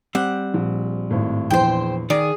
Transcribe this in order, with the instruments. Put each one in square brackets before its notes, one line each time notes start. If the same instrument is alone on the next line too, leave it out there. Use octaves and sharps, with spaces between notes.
[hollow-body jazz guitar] G3 C4 [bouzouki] F#5
[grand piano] A#1
G#1 A2
[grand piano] A#1 E2 [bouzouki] C5 G5
[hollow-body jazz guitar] D#3 D5 [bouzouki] G#4